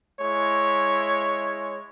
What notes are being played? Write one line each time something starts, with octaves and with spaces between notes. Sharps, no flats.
G#3 E4 C#5